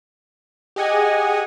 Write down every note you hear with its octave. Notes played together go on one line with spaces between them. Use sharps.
G4 G#4 D#5 F#5 G#5